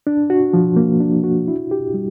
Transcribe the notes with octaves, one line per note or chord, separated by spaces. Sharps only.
D4
F#4
F3
A#3
D4
F#4
E4
G4
G3